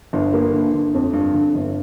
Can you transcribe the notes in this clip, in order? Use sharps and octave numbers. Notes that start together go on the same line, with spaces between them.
G1
A#3
D3
D3
F2
G2
D3
G1